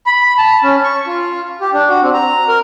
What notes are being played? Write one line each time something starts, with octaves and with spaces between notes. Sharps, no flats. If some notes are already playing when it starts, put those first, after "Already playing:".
B5
A5
C#4
C#6
F4
G4
D4
F#4
C4
A#5
A#4